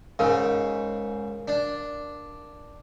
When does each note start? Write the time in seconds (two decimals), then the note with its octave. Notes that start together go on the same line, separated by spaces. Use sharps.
0.19 G#2 C#3 A#4 F5
1.48 D4